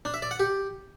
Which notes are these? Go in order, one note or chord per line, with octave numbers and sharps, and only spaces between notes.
D4
E5
D5
F#5
G4